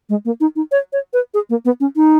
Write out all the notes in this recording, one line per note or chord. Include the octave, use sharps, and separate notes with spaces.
G#3
A#3
D#4
D#4
C#5
C#5
B4
G#4
A#3
B3
C#4
D#4